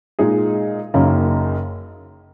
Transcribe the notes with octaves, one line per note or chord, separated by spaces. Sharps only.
A#2 G#3 D#4 G#4
F#1 F#2 C#3 A#3 D#4